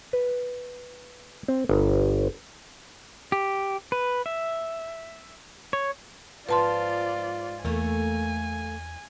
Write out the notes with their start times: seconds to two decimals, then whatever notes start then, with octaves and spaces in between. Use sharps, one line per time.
0.13 B4
1.48 C4
1.69 G1
3.32 G4
3.92 B4
4.26 E5
5.73 C#5
6.49 G#2 F3 F4 B4 D5 A5 C6
7.65 E2 A3 A#3 G#5